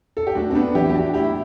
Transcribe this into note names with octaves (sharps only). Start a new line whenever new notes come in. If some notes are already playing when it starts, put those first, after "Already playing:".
A4
G4
A2 D4 F#4
C4
B3 D4
E3 E4 G4
G4
D4 F#4
A2 E4 G4